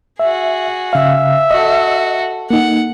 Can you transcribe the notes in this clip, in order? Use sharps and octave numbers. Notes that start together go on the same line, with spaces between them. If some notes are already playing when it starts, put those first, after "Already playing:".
F#4 G#4 E5
C#3 E5 F5
F#4 A4 D#5
A#3 D#4 F#5